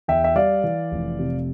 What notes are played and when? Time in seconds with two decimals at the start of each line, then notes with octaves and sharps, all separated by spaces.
0.08 E2 E5 G5
0.24 E5
0.35 G3 D5 F5
0.64 E3
0.91 F1
1.19 C3